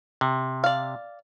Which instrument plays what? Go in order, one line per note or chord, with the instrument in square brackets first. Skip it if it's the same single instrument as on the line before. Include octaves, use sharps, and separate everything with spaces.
[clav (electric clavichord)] C3
[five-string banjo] D5 F5